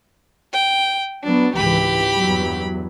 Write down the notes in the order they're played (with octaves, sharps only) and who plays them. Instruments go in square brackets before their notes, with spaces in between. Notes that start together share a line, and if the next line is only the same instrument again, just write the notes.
[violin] G5
[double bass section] F#3 B3 [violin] D4
[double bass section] G#1 C#2 E3 [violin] G4 B5
[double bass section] E2 G2 F#3